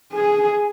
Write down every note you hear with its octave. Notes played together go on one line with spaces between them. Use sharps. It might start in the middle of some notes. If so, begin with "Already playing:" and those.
G#4 G#5
G#5